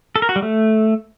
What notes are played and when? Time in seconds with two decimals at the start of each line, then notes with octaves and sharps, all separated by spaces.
0.16 A4
0.22 A#4
0.29 F#4
0.36 G3
0.42 A3